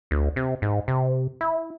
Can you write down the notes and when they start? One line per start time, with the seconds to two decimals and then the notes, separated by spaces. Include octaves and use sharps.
0.11 D2
0.36 C3
0.62 G#2
0.88 C3
1.41 E4